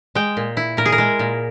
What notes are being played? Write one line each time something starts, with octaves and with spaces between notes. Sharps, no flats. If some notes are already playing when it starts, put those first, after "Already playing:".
G#3 G5
A#2
E4
A#2 A#4
G#4
A#4
G#3
A#2